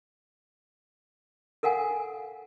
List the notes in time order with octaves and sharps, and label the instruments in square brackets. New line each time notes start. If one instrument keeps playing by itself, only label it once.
[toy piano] A4 A#4 F5 F#5 G#5